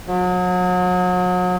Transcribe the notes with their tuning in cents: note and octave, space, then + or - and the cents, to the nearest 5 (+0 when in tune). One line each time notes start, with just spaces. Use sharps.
F#3 -35